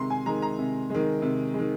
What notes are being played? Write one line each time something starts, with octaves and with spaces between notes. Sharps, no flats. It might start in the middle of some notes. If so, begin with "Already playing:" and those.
Already playing: C3 D#3 G#3 A#5 C6
G#5
D#3 G#3 A#5
A#5
C3
D#3 G#3
C3
D#3 G#3